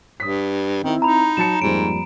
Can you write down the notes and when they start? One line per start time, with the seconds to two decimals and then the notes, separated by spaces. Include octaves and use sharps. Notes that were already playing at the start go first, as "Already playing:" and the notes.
0.20 G2 D#6 B6
0.84 D#3 C4 E4
1.02 D#4 A#5 B5
1.37 F#3 A5 C#7 E7
1.62 F2 G#2 G3 A#3 D7